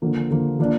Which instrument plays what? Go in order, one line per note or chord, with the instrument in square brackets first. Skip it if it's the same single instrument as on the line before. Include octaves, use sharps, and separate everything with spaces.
[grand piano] D3 F3 A#3
D3 F3 A#3
F3 A#3 D4